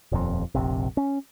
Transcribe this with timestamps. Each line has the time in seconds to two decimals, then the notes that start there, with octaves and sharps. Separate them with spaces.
0.12 D#1 F2
0.55 F1 A#1 C3
0.97 C#4